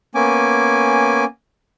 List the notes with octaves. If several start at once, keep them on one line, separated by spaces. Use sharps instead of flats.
A#3 B3 C#4 G#5 D6